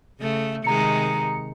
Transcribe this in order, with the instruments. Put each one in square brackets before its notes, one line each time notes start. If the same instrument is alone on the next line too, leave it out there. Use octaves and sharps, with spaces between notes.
[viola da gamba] C#3 A3
[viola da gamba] C3 D#3 G#3 [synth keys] A#5 C#7